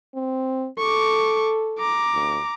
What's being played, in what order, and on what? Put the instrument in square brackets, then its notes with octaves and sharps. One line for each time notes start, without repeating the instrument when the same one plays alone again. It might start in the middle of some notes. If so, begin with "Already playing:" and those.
[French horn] C4
[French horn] A4 [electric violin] C#6 D6
[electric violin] A#5 D6
[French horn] D2